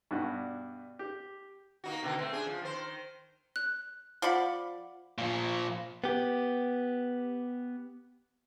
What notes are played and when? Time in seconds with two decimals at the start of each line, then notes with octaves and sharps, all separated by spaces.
0.11 G2 B2 D4 F#4
0.99 G4
1.84 A#3 D#4 F#4
2.03 B2 D3 D#3
2.18 A3 C4
2.33 D4 G#4
2.47 F3
2.62 D#3 C5
3.56 F#6
4.22 F3 D5 F5 F#5 B5
5.18 A#2 F3
6.04 B3 G4